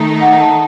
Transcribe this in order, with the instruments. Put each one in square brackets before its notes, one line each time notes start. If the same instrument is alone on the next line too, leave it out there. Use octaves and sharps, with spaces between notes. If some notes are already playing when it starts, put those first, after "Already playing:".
Already playing: [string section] D#3 A3 D#4
[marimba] F#5
A5